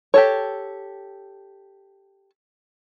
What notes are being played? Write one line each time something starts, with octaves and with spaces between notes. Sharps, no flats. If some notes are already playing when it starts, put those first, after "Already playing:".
G4 A4 C#5